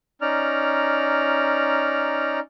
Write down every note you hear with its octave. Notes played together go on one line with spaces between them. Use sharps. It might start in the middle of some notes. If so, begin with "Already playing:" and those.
C#4 D#4 D5 A#5 F6